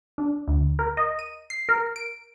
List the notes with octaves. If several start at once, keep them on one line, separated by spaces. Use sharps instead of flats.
D4
D2
A#4
D#5
D#7
C7
A#4
D7